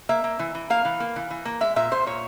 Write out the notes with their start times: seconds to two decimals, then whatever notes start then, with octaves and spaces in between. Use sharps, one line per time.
0.09 A#3 E5
0.24 A#3
0.39 E3
0.55 E3
0.70 A#3 F5
0.85 E3
1.00 A#3
1.16 E3
1.30 E3
1.45 A#3
1.61 G#3 E5
1.76 A#2 E5
1.91 A#2 C5
2.07 A#2 C#5